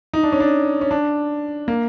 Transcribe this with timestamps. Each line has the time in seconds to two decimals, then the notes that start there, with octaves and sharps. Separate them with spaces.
0.13 D#4
0.23 D4
0.32 C#4
0.40 D4
0.81 C#4
0.91 D4
1.68 A#3